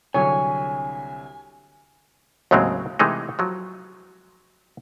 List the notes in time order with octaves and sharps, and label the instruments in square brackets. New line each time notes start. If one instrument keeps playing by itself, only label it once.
[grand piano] C2 D3 F#3 [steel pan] C#5 [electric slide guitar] G#5
[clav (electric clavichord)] D#2 A2 C#3 F#3 G#3 C4
C3 E3 G#3 A3 D#4
F3 F#3